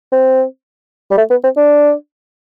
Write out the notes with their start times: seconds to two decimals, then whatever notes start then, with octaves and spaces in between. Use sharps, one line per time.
0.12 C4
1.11 G3
1.18 A3
1.30 B3
1.44 C4
1.57 D4